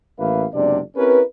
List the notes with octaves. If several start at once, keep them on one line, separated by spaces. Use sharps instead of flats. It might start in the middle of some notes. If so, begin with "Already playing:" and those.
A1 A#3 B4 E5 F5
F#1 C3 G#3 B3 D4 D5
C4 C#4 E4 G4 A#4 B4